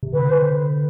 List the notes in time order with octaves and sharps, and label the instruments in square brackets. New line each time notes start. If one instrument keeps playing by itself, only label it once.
[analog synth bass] C3
[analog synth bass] D3 [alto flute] B4
[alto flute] C5